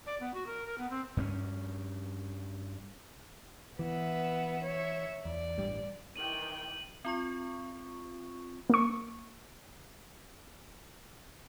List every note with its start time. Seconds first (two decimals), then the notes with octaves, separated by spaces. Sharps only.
0.06 D5
0.20 B3
0.34 F#4
0.47 A#4
0.66 A#4
0.78 B3
0.90 C4
1.17 G2 C4 C#4
3.79 E3 B3 E5
4.64 C#5 E5
5.25 E2 D5
5.57 A1 G2 G3
6.16 D#3 E3 G5 D#7 F#7
7.05 C4 F4 C#6
8.70 A#3 C#6